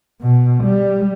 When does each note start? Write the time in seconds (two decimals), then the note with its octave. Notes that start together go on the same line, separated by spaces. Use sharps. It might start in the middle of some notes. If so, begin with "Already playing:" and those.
0.21 B2
0.64 G3